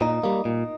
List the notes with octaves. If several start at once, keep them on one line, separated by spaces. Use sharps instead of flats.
A#2 D#4
G3 A#3
A#2